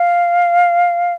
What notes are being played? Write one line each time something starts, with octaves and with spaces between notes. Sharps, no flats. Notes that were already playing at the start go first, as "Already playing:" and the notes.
Already playing: F5